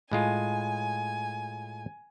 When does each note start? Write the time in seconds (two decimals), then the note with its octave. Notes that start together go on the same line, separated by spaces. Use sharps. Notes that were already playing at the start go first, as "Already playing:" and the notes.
0.11 A2 G#3 F4 G#5